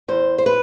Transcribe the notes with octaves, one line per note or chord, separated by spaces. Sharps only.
E2 C5
C5
B4